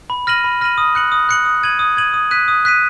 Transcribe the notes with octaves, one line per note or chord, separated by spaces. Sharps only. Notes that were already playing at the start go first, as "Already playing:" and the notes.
B5
F6 A#6 D#7 F#7
B5
F6 A#6 D#7 F#7
D#6
F#6 C#7 F#7
D#6
F#6 C#7 F#7
D#6
G#6 D#7 F#7
D#6
G#6 D#7 F#7
D#6
F#6 B6 D#7
D#6
F#6 B6 D#7